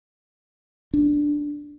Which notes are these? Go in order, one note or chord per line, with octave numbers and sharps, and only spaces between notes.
D4